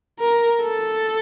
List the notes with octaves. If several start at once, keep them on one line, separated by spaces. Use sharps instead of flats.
A#4
A4